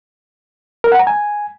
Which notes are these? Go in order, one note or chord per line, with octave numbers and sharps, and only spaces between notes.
A#4
F#5
A#5
G#5